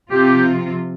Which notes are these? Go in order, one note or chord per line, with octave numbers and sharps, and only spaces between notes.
C3 F3 C4 F4 G4